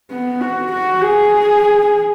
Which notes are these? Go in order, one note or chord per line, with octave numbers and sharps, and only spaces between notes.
B3
F#4
F#4
G#4